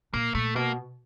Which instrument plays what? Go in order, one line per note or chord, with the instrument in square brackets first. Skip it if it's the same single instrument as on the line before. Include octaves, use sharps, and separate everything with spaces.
[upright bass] A#2 [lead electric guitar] A#3
[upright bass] A#2 [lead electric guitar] A3
[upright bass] B2 [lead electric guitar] A#3